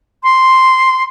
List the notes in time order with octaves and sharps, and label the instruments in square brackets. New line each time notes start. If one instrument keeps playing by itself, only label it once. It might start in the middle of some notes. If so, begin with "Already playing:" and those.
[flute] C6